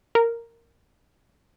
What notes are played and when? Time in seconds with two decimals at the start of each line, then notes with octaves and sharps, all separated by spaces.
0.15 A#4